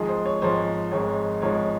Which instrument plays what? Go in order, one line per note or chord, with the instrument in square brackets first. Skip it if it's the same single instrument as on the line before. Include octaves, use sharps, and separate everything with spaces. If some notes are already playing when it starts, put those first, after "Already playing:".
Already playing: [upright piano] G#1 G#2 F3 G#3 G#4
C5
C#5
G#1 G#2 F3 G#3 C5
G#1 G#2 F3 G#3 C#5
G#1 G#2 F3 G#3 C#5